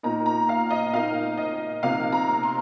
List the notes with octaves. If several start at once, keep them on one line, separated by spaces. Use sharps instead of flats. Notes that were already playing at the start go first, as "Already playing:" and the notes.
A#2 A#3 D#4 A#5
A#5
F5
D#5
A#2 A#3 D#4 F5
D#5
C3 F3 A#3 D#4 F5
A#5
C6